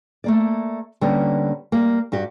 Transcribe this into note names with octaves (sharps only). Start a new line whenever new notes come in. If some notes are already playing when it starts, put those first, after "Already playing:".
A3 A#3 D5
D3 G3 A#3 B3 C#4
G3 A#3
G2 F#4 G4